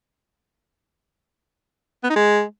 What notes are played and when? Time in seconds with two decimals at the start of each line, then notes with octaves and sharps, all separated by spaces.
2.04 B3
2.10 D#4
2.16 G#3